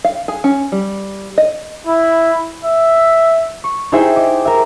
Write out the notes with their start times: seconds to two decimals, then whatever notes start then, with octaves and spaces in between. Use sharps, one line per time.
0.05 F5
0.28 G#4
0.44 C#4
0.72 G3
1.38 D#5
1.87 E4
2.65 E5
3.64 C#6
3.92 D#4 E4 G#4 C5 E5 G5
4.16 D#5 D6
4.45 A#4 E5